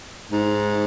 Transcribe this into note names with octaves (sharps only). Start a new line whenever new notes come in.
G#2